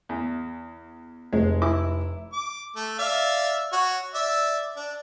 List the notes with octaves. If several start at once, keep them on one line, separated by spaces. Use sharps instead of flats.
E2
F1 G#3
E4 D6
D6
A3
D5 E5 F5
F#4 C#5
D5 E5 E6
D4